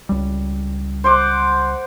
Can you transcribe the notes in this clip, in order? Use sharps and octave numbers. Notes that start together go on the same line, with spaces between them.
C#2 G3
C5 F#5 D6